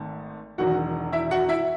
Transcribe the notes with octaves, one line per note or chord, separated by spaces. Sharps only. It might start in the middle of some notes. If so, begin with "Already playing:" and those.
Already playing: G#1 G#2 D#3 A3
E1 E2 D#3 F#3 F#4 F#5
E4 E5
F#4 F#5
E4 E5